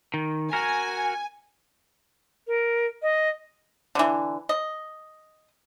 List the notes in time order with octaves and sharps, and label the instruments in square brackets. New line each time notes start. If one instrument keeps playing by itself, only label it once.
[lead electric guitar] D#3
[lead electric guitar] F#4 A#4 [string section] G#5
[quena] A#4
D#5
[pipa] D3 E3
D#5